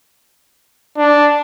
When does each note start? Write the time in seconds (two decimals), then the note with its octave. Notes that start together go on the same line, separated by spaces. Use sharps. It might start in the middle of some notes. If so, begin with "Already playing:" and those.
0.97 D4